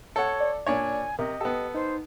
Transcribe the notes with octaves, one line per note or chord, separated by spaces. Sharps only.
A4 C#5 F#5
D5
A#2 D4 C#5 G#5
C3 A#4 D#5
B3 G4 A4
D#4 C5